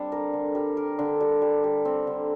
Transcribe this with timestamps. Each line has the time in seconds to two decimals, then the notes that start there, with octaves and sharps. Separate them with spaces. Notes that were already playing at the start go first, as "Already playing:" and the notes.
Already playing: G3 C4 D4
0.12 A#4
0.33 D3
0.55 G3
0.77 A#4
0.99 D3
1.21 G3
1.42 G3
1.64 G3
1.85 C4
2.07 D3